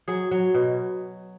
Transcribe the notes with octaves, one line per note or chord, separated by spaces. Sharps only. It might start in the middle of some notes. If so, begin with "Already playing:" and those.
F#3 G#4
F#3
B2